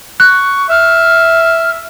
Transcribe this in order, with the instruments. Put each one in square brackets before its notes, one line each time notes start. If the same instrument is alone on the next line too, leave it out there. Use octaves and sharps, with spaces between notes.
[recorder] C#6 [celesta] F#6
[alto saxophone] E5 [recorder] F6